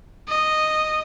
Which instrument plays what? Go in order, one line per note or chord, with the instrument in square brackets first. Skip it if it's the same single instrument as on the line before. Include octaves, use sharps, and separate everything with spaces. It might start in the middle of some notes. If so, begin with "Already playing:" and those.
[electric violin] D#5